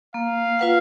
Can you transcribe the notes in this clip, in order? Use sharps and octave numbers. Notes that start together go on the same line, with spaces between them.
A#3 F5
F4 B4 F#5